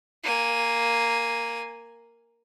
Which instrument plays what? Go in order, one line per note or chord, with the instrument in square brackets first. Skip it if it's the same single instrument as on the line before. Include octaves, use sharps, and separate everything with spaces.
[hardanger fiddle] A#3 G#5